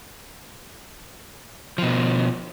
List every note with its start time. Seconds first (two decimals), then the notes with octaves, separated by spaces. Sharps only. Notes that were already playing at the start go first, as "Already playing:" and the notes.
1.78 B2 F3